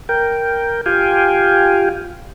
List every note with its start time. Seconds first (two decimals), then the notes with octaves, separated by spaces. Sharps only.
0.09 A#4 G5
0.86 F4 G4 F5 G5 G#5